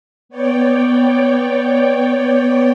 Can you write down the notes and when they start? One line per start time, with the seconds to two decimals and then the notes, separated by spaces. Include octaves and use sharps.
0.29 B3 C#5 D5 G5